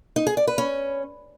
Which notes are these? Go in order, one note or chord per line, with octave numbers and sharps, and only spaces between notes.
D#4
G#4
D5
B4
C#4